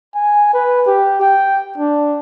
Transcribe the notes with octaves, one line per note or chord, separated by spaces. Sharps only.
G#5
B4
G4
G5
D4